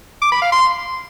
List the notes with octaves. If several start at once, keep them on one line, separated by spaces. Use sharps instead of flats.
D6
B5
F5
C6